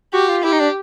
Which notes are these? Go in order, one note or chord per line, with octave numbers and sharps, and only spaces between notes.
F#4 G4
F4
E4 G4
D#4
D4